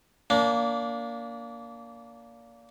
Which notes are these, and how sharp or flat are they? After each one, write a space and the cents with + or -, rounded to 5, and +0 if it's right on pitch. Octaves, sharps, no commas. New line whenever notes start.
A#3 +0 D4 -30